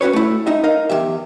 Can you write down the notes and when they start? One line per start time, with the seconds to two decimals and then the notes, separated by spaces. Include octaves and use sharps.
0.01 C#4 F#4 G#4 B4 C#5
0.13 A3 E4
0.47 D#4 D#5 E5
0.63 D#4 A#4 D#5 F5
0.90 E2 D#3 G4 E5